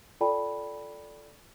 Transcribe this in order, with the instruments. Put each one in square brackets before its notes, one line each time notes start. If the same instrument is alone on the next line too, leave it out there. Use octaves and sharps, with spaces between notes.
[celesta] F4 A4 D5 G5 A5 B5